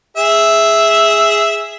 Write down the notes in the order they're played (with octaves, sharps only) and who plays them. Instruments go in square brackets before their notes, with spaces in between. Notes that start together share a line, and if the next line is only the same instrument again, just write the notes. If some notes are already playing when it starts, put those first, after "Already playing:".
[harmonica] G#4 E5